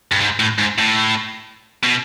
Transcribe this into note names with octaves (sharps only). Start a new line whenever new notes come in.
G2
G#2
A2
G#2
A2
B2